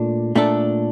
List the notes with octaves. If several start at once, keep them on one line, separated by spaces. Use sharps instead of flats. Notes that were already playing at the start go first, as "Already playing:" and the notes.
Already playing: A#2 A3 D4
A#2 A3 D4 A4